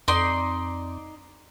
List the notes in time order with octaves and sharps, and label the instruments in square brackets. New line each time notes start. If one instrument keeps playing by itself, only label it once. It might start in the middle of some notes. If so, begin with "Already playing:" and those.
[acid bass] F2 [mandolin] D#4 D5 C6